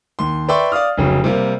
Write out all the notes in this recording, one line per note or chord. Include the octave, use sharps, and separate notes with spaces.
D#2 C6
B4 D5 E5 G5 C6 C#6
D5 F5 D#6 F6
F1 C#3 F#3
C3 G3 A#3